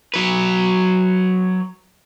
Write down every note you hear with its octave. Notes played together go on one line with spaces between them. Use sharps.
F#3 B4